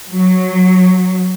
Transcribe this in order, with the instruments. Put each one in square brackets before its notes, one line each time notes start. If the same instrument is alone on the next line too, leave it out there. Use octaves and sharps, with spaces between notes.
[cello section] F#3